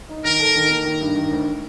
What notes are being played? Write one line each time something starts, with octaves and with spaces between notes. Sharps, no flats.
D#4
D#3 A#4
A4
D#3
A#3
D#3
G2
D#3
D2